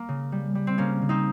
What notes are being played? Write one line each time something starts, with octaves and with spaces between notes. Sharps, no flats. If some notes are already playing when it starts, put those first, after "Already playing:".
Already playing: A#3
C#3
G3
G3
C4
C#3 A#3 C#4
C#3
C4 D#4